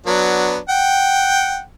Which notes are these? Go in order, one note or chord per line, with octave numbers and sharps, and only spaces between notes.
F#3 B3 D4
F#5 G5